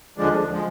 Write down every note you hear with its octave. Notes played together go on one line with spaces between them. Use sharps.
D#2 D3 F3 G#3 D4
F3 G#3